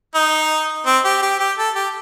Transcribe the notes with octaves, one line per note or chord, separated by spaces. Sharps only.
D#4
C4
G4
G4
G4
A4
G4